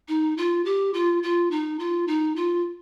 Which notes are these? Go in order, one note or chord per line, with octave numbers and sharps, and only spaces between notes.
D#4
F4
G4
F4
F4
D#4
F4
D#4
F4